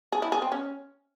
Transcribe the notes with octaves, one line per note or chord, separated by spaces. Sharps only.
G#4
E4
G#4
C4
C#4